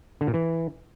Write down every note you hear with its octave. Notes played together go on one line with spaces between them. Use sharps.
D3
A#2
E3